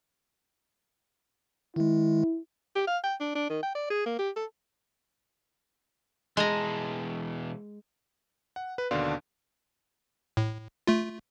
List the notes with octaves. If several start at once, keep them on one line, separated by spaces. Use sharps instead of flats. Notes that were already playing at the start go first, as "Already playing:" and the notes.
D#3 G#3 E4
G4
F5
G5
D4
D4
D#3
G5
D5
G#4
A#3
G4
A4
B2 E3 G#3 A5 A#5
F#5
B4
D#2 B2 D3 D4 F5 C6
A2
A3 F4